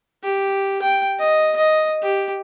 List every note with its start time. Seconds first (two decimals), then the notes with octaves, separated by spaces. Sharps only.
0.23 G4
0.82 G5
1.19 D#5
1.56 D#5
2.02 G4